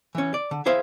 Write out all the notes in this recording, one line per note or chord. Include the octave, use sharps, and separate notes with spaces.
E3 C#4
D5
D3
E4 G#4 C5 E5 F5